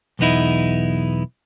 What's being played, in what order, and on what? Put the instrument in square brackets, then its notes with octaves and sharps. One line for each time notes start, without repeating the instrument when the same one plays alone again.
[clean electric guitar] B1 E2 B3 D#4 E4